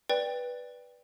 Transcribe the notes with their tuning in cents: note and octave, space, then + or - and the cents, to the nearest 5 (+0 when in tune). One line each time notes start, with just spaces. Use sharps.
B4 -5 D5 +0 G5 +10